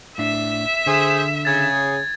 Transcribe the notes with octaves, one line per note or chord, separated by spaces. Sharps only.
A2 D4 E5
D3 G#4 C5
C#3 G#4 G#6 A6